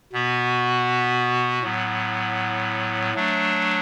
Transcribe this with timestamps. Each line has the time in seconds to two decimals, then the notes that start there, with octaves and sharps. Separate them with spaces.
0.13 B2 B3 F#4
1.63 A2 F#3 B3
3.14 F#3 A3 D4